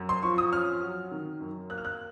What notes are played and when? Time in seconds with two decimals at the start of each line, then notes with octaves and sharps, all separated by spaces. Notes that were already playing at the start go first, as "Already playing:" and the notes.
Already playing: F#2
0.09 C6
0.23 F3 C#6
0.38 D#6
0.53 C#4 F6
0.82 F#3
1.11 D#3
1.41 F#2
1.70 A#3 F#6
1.78 F6
1.85 F#6